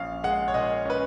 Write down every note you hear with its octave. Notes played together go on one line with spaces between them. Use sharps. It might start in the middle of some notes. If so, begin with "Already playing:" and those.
Already playing: A#1 C#4 F5
G#3 F#5
C#5
A#2 D#5
C#4 B4